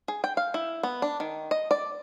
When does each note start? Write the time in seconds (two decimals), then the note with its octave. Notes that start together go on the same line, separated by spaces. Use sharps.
0.08 G#4
0.24 G5
0.37 F5
0.54 E4
0.83 B3
1.02 D4
1.20 D#3
1.51 D#5
1.71 D5